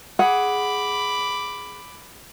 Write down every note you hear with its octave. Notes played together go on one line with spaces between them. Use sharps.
G#4 F#5 B5 D6